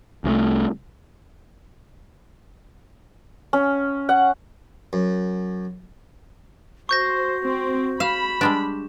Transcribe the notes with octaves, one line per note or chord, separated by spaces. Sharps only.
C2 E3 A3
C#4
F#5
F#2
F#4 C5 C#6 G6 A#6
C4
F5 B5 E7
G3 G#3 D4